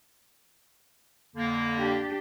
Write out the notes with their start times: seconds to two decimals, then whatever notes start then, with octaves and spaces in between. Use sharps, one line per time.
1.36 F2 D3 A#3
1.76 D4 G4